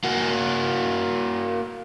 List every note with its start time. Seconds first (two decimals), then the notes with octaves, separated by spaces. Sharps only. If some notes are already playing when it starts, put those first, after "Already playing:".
0.04 A#3 F#4